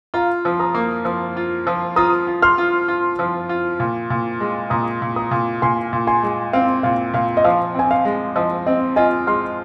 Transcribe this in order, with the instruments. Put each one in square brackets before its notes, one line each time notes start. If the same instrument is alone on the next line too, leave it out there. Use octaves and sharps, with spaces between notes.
[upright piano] F4 [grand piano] F5 A#5
[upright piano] F3
[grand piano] A#5 D#6
[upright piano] A#3
F3
F4
F3
[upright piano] F4 [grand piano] A#5 D#6
[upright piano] F4
[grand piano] C6 F6
[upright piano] F4
F4
F3
F4
A#2
A#2
G#3
[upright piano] A#2 [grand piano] A#5 D#6
[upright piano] A#2
[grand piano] A#5 D#6
[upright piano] A#2
[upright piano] A#2 [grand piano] G#5 C6
[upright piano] A#2
[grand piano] G#5 C6
[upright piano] G#3
[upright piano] C4 [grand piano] F5
[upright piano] A#2 [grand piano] F5
[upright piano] A#2 [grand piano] F5
[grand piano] D#5
[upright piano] F3 [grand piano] F5
[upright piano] C4 [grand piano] G#5
[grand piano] F5
[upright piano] G#3
[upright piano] F3 [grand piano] D#5
[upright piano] C4 [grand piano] D#5
[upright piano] F4 [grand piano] D#5 G#5
[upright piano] G#3 [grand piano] C6 F6